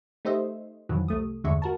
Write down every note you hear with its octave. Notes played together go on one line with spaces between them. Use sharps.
A3 D#4 G4 C5 D#5 E5
F2 B2 D#3 E3 F#3
C2 A3 D#6
E2 G2 D3 G#3 E5 C#6
F#4 A#4 A5